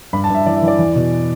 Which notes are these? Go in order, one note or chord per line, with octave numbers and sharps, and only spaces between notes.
G2 B5
A5
G2 E5
E3 D5
E5
E3
D5
E2
B2